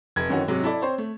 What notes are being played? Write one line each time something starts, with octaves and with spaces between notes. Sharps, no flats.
F1 G#6
F#2 D#3 E3 C#4 F#4
G#2 C3 F#3 G#3
E4 A4 D5
C4 C5 C#5
A3